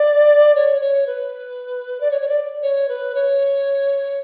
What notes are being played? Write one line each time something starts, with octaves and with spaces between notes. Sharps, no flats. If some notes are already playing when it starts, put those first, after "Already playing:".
Already playing: D5
C#5
C#5
B4
D5
C#5
C#5
D5
C#5
B4
C#5